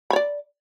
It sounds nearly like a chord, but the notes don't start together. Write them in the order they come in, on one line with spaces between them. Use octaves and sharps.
B5 C#5 D5